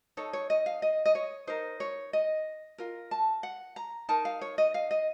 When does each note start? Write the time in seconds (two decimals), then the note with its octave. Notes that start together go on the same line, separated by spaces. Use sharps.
0.17 D#4 A4 C#5
0.33 C#5
0.50 D#5
0.66 F5
0.82 D#5
1.05 D#5
1.15 C#5
1.47 D#4 A#4 C5
1.80 C#5
2.13 D#5
2.78 F4 A#4
3.11 A5
3.43 F#5
3.76 A#5
4.09 D#4 A#4 A5
4.25 F5
4.41 C#5
4.58 D#5
4.74 F5
4.91 D#5